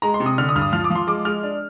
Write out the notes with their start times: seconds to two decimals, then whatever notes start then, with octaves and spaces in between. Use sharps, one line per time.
0.02 G#3 A#5
0.14 C6
0.20 C3
0.26 D#6
0.38 D3 F6
0.49 D#6
0.55 G2 F6
0.61 D#6
0.73 F3 F6
0.84 D6
0.90 F3
0.95 C6
1.07 G#3 D6
1.25 G#3 F6
1.43 D4